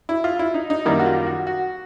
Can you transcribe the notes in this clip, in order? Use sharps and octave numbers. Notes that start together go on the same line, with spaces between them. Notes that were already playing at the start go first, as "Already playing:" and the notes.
E4
F4
E4
D#4
D#4
F#2 D#3 G3 A#3 E4
F#4
F4
F#4
F#4